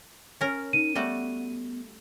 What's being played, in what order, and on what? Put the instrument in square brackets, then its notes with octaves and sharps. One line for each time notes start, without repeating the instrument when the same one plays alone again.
[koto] C#4 A#4
[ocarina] D#4 [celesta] D#7
[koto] G3 A3 F#4 [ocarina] B3